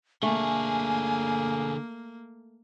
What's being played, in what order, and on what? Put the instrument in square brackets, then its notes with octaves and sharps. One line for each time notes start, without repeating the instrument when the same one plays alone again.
[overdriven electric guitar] D3 G#4 [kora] A3 [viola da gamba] A#3 [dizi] G#5